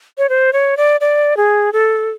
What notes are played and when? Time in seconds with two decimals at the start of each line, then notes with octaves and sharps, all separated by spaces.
0.18 C#5
0.29 C5
0.53 C#5
0.77 D5
1.01 D5
1.37 G#4
1.73 A4